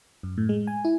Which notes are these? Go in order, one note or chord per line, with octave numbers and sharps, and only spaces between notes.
F#2
A2
G#3
G#5
E4